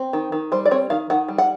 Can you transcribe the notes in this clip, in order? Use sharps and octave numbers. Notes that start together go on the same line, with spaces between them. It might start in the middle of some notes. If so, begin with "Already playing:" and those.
Already playing: C4
D#3
D#3
G3 C5
D5
C4 C#5
D#3 F5
D#3 F#5
G3
F#5